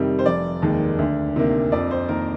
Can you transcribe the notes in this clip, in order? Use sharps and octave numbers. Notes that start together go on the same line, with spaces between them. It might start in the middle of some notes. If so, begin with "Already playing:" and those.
Already playing: F2 C3 D#3 G3
C5
F1 D5
D#2 D#3 G#3
D2
C3 D#3 A#3
F2 D5
C5
D#3 A#3 A#4